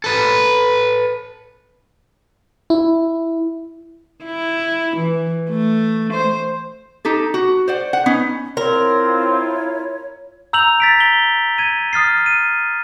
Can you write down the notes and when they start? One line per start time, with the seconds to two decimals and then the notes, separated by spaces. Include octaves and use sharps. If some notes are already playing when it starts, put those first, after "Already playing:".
0.04 A4 B4
2.70 E4
4.24 E4
4.97 E3
5.49 A3
6.13 C5
7.05 D#4 G4 A4
7.34 F#4
7.68 C5 D5 F#5
7.93 F#5
8.06 B3 C#4 D#4
8.57 C4 E4 F4 A#4 C#5
10.53 A#5 E6 G6 F7 F#7
10.80 A6 B6 D7
11.00 G7
11.58 G#6 D#7
11.93 D#6 F6 A6 C7
12.26 D#7